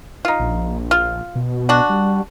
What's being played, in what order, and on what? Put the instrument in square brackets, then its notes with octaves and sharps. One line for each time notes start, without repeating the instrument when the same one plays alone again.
[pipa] D#4 F4
[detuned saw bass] A#1
[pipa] F4
[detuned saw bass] B2
[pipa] D4 F#4
[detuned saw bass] G3